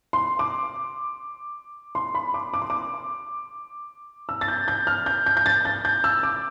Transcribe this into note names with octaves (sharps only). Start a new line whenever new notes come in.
C6
D6
C6
B5
D6
D6
C6
D6
E6
A6
G6
G6
F6
G6
G6
G6
A6
G6
G6
E6
D6